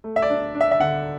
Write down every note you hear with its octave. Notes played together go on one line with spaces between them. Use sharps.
A3
E5
D5
D4
D4
E5
E5
D3 F#5